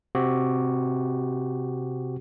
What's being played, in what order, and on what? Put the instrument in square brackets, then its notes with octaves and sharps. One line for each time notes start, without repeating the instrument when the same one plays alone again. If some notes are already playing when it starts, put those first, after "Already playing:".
[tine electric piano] C3 C4 F#4 G4